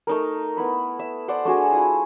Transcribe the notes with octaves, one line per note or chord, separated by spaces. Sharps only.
A3 D#4 A#4
B3 E4 B5
E5
C5 D5 F#5 C6
A3 D4 F#4 G#4
E4 F4 D#6